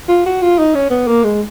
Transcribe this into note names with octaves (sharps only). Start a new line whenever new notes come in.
F4
F#4
F4
D#4
C#4
B3
A#3
G#3